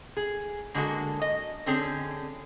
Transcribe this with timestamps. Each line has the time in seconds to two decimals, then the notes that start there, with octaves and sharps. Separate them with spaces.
0.17 G#4
0.74 D3 G#3 A#3 F#4 A4
1.22 D#5
1.66 D3 C4 C#4 G#4 D5